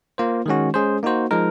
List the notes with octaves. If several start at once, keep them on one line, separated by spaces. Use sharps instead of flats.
A#3 F4 C5
D#3 G#3 C#4 F#4
G#3 C#4 G#4 C5
A#3 D#4 F#4 C5
F3 G#3 D#4 A#4